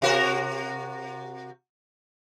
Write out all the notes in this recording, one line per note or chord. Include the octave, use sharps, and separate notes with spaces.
C3 F#4 A#4